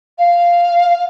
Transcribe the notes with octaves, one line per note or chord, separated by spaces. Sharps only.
F5